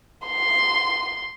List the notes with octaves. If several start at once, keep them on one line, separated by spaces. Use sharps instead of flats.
C6